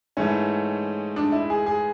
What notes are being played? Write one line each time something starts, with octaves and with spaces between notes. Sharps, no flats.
G#2 E3 A3 C#4
D4
E4
G#4
G#4